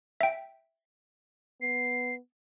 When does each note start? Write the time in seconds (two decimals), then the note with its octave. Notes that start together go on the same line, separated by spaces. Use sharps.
0.21 E5 G5
1.62 B3 C7